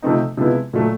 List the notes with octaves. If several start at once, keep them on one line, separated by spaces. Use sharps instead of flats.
C3 F3 A3 C4 D#4
C3 F3 G#3 B3 E4
A#2 F#3 A3